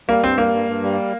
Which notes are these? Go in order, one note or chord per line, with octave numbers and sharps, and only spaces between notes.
G3 A#3
G2 C4
G3 A#3
G2
G2
G3